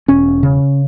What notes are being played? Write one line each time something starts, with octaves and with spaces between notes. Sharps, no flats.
E1 C#4
C#3